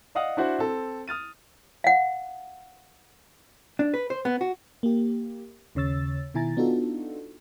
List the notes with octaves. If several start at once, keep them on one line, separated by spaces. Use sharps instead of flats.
D5 D#5 F5 F#5 D#6
D4 E4 F#4 C5 F#5
C4 A4
D#6 F6 A6 D#7
F5 F#5
D4
B4
C5
B3
F#4
A#3 G4
D#2 C#3 C#5 E6 A6
B2 D#3 E4 G#5 A#5 A6
B3 D4 D#4 F4 F#4 A4